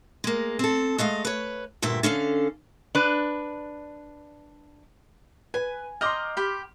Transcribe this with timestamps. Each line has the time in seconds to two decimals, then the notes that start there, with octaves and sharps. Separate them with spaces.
0.24 G#3 A#3
0.59 C4 A4
0.98 G#3 A3 D#5 F5
1.25 B4 C#5
1.82 D2 G2 A#2 G4 E5
2.03 D3 C#4 A4 F5
2.95 D4 B4
5.54 B4 G#5
6.01 D#5 G5 A#5 C6 D6 F6
6.37 G4 G5 B5